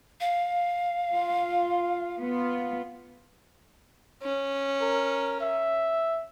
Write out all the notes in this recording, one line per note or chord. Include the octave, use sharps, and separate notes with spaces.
F5
F4
B3 F4
C#4
A#4
E5